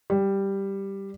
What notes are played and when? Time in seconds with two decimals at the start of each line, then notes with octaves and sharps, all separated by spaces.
0.10 G3